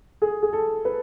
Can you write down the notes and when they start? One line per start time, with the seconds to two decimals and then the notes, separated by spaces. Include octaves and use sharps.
0.22 G#4
0.43 G#4
0.53 A4
0.85 B4